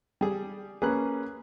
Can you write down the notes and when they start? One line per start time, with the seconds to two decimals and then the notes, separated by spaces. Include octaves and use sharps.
0.21 G3 G#4
0.82 A#3 C#4 G#4 B4 F#6